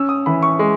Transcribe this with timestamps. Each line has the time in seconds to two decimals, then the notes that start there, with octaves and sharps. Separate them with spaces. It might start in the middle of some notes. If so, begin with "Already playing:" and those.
Already playing: C#4 E6
0.09 D#6
0.26 E3 B5
0.42 C#6
0.59 G#3